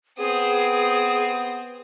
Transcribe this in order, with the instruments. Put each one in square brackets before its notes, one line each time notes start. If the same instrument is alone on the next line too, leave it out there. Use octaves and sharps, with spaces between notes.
[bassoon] B3 [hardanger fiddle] C4 D#6 [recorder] G#4